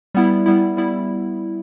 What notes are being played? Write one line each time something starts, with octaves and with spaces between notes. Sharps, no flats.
G3 B3 E4
G3 B3 E4
G3 B3 E4